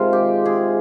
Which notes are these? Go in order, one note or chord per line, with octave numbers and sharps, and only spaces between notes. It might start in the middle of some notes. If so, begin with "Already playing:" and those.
Already playing: C3 D#3 G#3 F4
G4
G#4